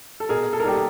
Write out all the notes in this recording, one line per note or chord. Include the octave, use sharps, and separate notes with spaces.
A4
B2 G#4 A#4
A4
A#4
G3 A#3 D#4 G4 A4